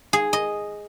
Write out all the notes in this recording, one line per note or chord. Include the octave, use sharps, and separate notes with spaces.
G#4
D#5